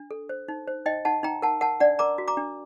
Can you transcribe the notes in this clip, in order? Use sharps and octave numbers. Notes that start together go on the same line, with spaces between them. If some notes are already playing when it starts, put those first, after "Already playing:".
Already playing: D4
A4
C5
D#4
C5
D#4 D#5 G5
D#4 F#5 A5
D#4 G5 A#5
A#4 F#5 A5
A#4 F#5 A5
D4 D5 F#5
A#4 A#5 D6
F#4
A#5 D6
D4